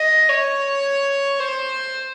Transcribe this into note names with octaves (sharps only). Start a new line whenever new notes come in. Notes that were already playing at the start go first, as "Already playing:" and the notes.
Already playing: D#5
C#5
C5